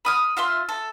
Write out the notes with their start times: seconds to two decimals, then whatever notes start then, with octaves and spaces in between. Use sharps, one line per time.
0.05 B5 D#6 F6
0.37 F4 E5 C6
0.69 A4